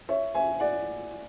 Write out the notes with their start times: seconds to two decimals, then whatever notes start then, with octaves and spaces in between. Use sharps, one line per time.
0.09 C#5 E5
0.34 E5 G#5
0.60 D5 F#5